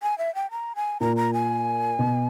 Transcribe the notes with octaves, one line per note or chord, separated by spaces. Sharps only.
G#5
E5
G5
A#5
G#5
A#2 A#5
A#5
G#5
B2